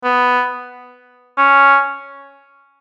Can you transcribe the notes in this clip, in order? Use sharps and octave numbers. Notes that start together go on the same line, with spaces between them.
B3
C#4